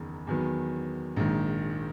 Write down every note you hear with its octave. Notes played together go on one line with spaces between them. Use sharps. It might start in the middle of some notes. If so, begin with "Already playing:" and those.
Already playing: F#1 E2 D#3
E2 D#3 F#3 B3
A#1 G#2 D#3